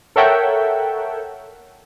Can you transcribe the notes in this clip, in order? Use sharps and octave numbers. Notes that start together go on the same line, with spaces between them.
A4 A#4 C#5 E5 F#5 G5